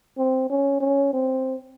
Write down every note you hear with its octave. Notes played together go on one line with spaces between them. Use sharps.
C4
C#4
C#4
C4